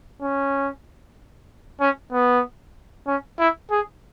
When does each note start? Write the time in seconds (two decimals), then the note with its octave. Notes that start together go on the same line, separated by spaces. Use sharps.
0.22 C#4
1.80 C#4
2.13 B3
3.07 C#4
3.39 E4
3.71 G#4